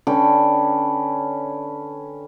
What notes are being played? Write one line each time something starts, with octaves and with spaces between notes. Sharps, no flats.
D3 C#4 B4 G5